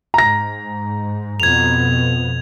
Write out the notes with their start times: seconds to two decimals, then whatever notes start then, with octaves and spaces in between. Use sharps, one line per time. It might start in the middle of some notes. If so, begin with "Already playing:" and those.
0.14 G#2 A#5 A#6
1.40 F2 B2 B3 G#6 F7